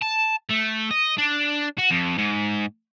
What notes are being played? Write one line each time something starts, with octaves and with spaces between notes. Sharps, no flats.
A5
A3
D#5
D4
F#4
F2
G#2